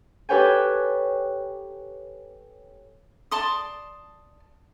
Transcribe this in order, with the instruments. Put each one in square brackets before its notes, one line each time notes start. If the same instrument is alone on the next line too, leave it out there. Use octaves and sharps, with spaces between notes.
[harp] G4 A4 B4 C#5 G5 G#5
[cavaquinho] D5 A5 C6 D#6